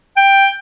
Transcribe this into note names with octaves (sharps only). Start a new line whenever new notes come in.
G5